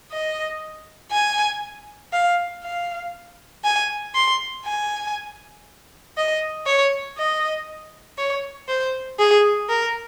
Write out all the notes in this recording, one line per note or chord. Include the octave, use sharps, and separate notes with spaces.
D#5
G#5
F5
F5
G#5
C6
G#5
D#5
C#5
D#5
C#5
C5
G#4
A#4